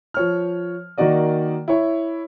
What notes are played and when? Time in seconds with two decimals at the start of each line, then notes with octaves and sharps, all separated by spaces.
0.14 F3 C#5 F6
0.98 D#3 A#3 F#4 D5 D#5
1.68 E4 C#5